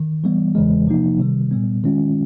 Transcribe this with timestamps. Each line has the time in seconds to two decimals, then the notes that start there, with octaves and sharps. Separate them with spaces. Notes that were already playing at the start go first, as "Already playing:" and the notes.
Already playing: D#3
0.24 E3 G3 B3
0.55 E2 C#3 E3 G#3
0.87 C3 F3 A#3 D#4
1.19 C3 D#3 G3
1.51 A#2 G3 B3
1.83 D#3 G#3 C#4 F4